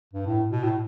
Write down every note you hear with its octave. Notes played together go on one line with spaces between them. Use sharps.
G2
A2
B2
A2